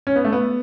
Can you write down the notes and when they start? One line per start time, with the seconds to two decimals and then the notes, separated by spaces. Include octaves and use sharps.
0.07 C#4
0.16 B3
0.24 A3
0.32 B3